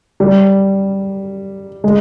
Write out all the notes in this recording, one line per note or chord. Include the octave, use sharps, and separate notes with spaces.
G3
G#3